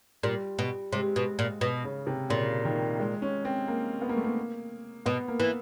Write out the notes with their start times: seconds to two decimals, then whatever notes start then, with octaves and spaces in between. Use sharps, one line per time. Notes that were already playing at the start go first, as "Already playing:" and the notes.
0.23 A#2 G3
0.59 B2
0.92 C3 G#3
1.16 B2
1.39 A#2
1.61 B2
1.84 C#3
2.07 C3
2.30 A#2 C#3
2.65 D#3
3.00 G#3
3.22 C#4
3.45 C4
3.68 A#3
4.02 B3
4.09 A#3
4.17 A3
4.24 A#3
5.06 B2 B3
5.28 A#3
5.40 E3